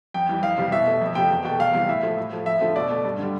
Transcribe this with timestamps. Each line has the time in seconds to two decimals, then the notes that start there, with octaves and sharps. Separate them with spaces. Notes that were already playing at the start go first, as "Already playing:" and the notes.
0.14 F2 G5
0.29 E3 G3
0.43 F2 F5
0.58 C3 E3 G3
0.72 B2 E5
0.86 A3
1.01 F2
1.15 C3 F3 A3 G5
1.31 E2
1.44 B2 G5
1.50 A3
1.60 E2 F5
1.73 C3 E3 G3
1.88 A2 E5
2.03 F3 A3
2.17 A2
2.32 F3 A3
2.46 F2 E5
2.61 D3 F3 A3
2.76 B2 D5
2.90 A3
3.04 G2
3.19 D3 G3